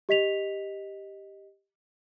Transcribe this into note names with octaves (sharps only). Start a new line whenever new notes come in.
G4 D#5 B6 F7